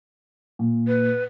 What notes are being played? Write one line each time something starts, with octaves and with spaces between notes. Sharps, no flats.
A#2
B4